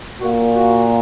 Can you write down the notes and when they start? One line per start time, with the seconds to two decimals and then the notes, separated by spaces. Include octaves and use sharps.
0.19 A#2 A#3 F#4
0.53 F#4